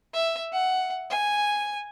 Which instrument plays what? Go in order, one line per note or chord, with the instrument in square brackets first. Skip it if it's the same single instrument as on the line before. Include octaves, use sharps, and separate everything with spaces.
[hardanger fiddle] E5
F#5
G#5